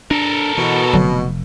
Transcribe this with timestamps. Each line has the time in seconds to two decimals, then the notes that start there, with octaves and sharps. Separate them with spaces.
0.11 D4 A4 A#4
0.57 B2 E3
0.93 F1 D3 F#3